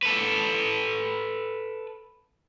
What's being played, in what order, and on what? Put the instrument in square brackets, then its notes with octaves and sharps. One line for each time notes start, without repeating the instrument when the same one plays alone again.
[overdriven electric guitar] A4 B4